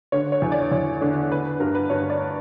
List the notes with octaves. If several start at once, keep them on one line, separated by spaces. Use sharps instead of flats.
D3 C#5
C#5
E2
D5
E2 C#5
D3
D3 B4
B4
G2 A#4
B4
G2 C#5
D5